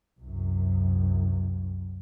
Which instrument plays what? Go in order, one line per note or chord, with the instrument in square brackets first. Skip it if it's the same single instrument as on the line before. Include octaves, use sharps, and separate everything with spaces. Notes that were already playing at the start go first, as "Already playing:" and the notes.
[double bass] C2 F#2